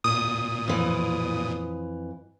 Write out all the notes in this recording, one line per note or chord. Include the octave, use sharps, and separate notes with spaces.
A#2 D#6
F2 E3